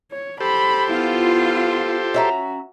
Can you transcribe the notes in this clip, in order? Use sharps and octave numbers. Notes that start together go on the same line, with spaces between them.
C#5
G4 A4 C5 B5
B3 E4 F4
C#4 F#4 E5 A#5